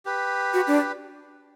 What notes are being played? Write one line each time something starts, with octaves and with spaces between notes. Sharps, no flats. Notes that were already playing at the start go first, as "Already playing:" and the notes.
G4 B4
F#4
D4